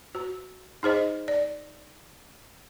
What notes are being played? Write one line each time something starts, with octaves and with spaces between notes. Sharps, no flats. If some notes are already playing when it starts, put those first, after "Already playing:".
F#4
D#4 G#4 C5 D#5
D5